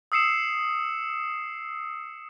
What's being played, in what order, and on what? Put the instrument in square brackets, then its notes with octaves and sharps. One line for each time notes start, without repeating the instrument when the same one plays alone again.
[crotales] D#6 E6 C7 C#7 E7